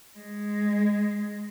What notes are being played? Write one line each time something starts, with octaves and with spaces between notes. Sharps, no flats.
G#3